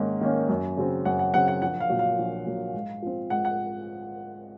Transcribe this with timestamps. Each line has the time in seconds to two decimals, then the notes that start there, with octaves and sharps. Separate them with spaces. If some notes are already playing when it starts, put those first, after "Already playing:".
Already playing: G#2 D#3 A#3 C#4
0.21 D#3 A#3 C#4
0.49 F#2
0.77 C#3 F#3 C4
1.05 F#2 F#5
1.19 F#5
1.34 C#3 F#3 C4 F#5
1.48 F#5
1.62 A#1 F#5
1.80 F5
1.89 A#2 F#3
1.99 F5
2.19 A#1
2.46 A#2 F#3
2.74 G#2
3.02 F3 C4
3.30 G#2 F#5
3.45 F#5